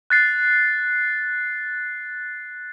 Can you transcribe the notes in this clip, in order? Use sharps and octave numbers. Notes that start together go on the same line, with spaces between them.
F#6 A6 C7